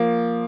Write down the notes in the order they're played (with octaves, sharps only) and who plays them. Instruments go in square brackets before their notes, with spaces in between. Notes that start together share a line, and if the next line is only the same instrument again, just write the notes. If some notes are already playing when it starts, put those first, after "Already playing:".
Already playing: [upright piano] F3 A#3